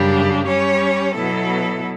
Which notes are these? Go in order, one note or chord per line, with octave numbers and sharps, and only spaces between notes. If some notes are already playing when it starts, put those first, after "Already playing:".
Already playing: F#2 C#3 G3 D4 G4
G3 C#4 G4 C#5
B2 F#3 B3 E4 A4